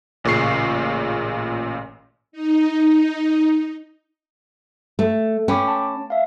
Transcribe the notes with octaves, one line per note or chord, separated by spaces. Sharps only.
A1 A#2 C#3 C#6 C7
D#4
A3
C#4 G5 B5 D6
A5
E5 F5